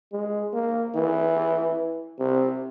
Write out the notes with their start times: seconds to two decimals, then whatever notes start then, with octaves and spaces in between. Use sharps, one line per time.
0.13 G#3
0.53 A#3
0.95 E3
2.19 C3